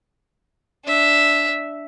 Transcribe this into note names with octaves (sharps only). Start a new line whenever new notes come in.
D4 E5